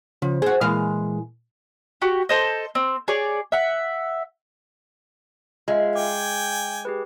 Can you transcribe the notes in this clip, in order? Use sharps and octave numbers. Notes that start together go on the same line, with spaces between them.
C#3 F3
F#4 G#4 C5
A#2 E3 G#3 F5
F#4 G4
A4 C5 D#5
C4
G#4 C#5 D5
E5 F#5
G#3 F4 E5 F5
G5 G#5 D6
G4 G#4 B4